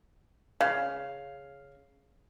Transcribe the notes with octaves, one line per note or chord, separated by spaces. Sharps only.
C#3 F5